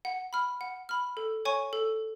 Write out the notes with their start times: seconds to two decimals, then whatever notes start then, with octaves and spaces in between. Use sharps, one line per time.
0.05 F#5
0.33 B5 F6
0.61 F#5
0.89 B5 F6
1.17 A4
1.45 C#5 G#5 C#6
1.73 A4